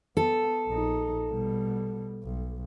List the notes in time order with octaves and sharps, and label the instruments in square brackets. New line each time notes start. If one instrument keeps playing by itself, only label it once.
[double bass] B3 [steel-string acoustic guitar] A4
[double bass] A#1 D#4
B2 G3
B1